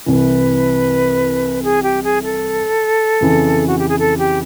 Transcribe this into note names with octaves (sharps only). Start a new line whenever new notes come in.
C2 C3 E3 B4
G#4
G4
G#4
A4
F2 C#3 E3
F#4
G4
G#4
A4
G4